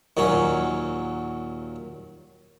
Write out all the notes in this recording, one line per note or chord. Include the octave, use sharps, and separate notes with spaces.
D#2 A#2 F#3 C#4